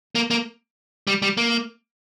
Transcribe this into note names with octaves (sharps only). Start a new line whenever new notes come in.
A#3
A#3
G3
G3
A#3